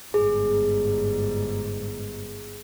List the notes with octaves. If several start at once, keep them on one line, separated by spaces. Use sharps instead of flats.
G1 G#2 G#4